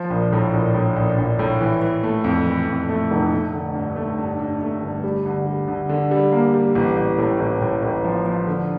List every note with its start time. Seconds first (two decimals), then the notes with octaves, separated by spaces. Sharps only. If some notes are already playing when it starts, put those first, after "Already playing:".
Already playing: F3
0.10 A#1
0.32 A2
0.54 A#1
0.74 A2
0.96 A#1
1.18 A#1
1.39 A2
1.61 E3
1.82 E3
2.03 A3
2.24 F2
2.46 E3
2.68 F2
2.89 A3
3.11 F1
3.32 A3
3.53 D3
3.75 G2
3.96 A3
4.19 G2
4.40 G2
4.61 A3
4.82 G1
5.04 G3
5.25 D2
5.47 G3
5.68 D2
5.89 D3
6.11 G3
6.32 A#3
6.54 G3
6.75 A1
6.97 A1
7.18 A2
7.39 A1
7.61 A2
7.83 A1
8.04 F3
8.26 F3
8.47 D3